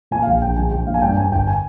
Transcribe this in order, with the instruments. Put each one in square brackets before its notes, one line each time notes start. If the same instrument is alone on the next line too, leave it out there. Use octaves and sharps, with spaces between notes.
[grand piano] A#2 G#5
F5
A#1 G5
A#1 G5
A#1 G#5
A#1 G5
A#2 F5
G#5
G2 G5
G2 G#5
G1 G5
G#5